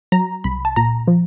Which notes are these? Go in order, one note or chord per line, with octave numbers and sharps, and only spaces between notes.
F#3 A#5
C2 B5
A5
A#2 A#5
F3